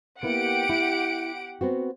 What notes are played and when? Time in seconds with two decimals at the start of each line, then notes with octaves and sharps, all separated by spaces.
0.23 A#3 B3 E4 G4 F#5 D7
0.69 E4
1.61 B3 C4 F#4